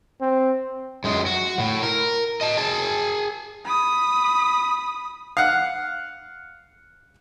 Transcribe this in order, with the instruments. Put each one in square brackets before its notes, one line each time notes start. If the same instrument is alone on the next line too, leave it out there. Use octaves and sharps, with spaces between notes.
[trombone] C4
[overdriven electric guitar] F#2 G#3
F#4
A2
A#4
D#5 A5
G#4 A5
[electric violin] B5 D#6
[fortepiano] F5 F#5